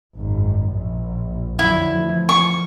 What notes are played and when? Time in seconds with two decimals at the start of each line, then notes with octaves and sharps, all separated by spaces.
0.15 G#1 F#2
0.70 A#1
1.59 F2 D3 F#3 E4
1.94 E3 F3 A3
2.29 F3 C#6